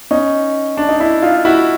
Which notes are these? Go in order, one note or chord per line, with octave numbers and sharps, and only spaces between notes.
C#4 D#4
D4
D#4
D4 E4
D#4 F4
E4 F#4